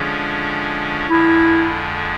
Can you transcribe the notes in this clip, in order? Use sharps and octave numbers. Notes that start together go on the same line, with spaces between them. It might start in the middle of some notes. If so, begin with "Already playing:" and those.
Already playing: D3 F3 G#3 C#4
F2 D3 F3 G#3 E4